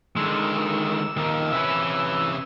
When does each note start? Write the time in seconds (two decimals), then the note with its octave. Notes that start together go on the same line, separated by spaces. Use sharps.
0.16 D3 D#3 G#3 E6
1.16 D#2 D#3 F3
1.52 C3 C#4 B4 E5